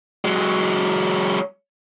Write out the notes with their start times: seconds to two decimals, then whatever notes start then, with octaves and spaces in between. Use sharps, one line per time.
0.25 F#3 G#3